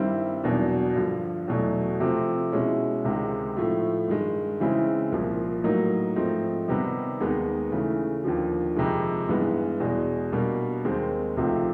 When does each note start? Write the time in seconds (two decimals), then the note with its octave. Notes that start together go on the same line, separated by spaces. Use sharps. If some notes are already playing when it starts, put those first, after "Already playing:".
Already playing: G2 D#3 G3 C4 E4
0.44 E2 B2 F#3 A#3 D4
0.96 G2 D3 F3
1.48 E2 B2 F#3 A3
2.00 C3 F3 A3 C4
2.52 B2 G#3 C#4 E4
3.04 C#2 C3 D#3 G#3
3.57 A2 F3 A3
4.08 G2 D#3 G#3
4.60 C#3 E3 G#3 C4 E4
5.12 C2 A#2 F3
5.64 A2 F#3 A#3 D#4
6.16 G#2 F3 A3 C4 D#4
6.68 C3 D#3 G3 B3 D#4
7.20 D#2 D#3 G#3 B3 D#4
7.72 C#3 E3 A3
8.24 D#2 D3 F3
8.76 F2 C3 D#3 G#3
9.29 G2 E3 G#3 B3
9.80 E2 B2 G#3
10.32 B2 G3 A#3 D4
10.85 D#2 D#3 G#3 C4
11.37 C#2 C3 F3 A3 C4